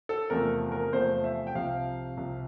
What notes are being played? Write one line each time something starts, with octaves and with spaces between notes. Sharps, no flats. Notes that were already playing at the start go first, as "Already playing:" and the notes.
A4
E2 C3 F3 A3 A#4
A#4
E2 C3 F3 A3 C5
E5
G5
C2 C3 F3 F5
C2 C3 F3